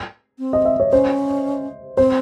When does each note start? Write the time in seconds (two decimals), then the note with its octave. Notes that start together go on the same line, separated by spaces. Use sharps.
0.39 C4
0.53 D#5
0.65 E5
0.80 C#5
0.92 C#4 C5
1.97 C4 C5